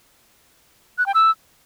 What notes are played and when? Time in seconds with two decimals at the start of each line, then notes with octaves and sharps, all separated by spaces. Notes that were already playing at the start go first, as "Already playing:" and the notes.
0.98 F#6
1.06 G5
1.14 E6